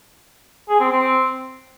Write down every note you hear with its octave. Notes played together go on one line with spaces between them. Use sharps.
G#4
C4
C4